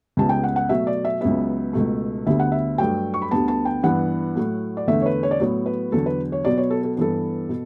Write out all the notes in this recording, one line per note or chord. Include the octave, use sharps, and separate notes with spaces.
C#2 C#3 G3 B3 A5
G5
F#5
F#5
B2 F#3 A3 E5
D5
E5
C#2 C#3 F#3 B3 E5
C#2 B2 A3
D2 D3 G3 B3 E5
F#5
E5
G2 F#3 A3 G5
C#6
B5
D2 D3 G3 B3 A5
A5
G5
G2 E3 B3 F#5
A2 F#3 A3
D5
E2 D3 A3 E5
C#5
B4
C#5
D5
A2 F#3 B3 C#5
B4
E2 D3 F#3 A4
B4
C#5
B2 F#3 B3 D5
C#5
A4
A4
G2 E3 B3 A4
B2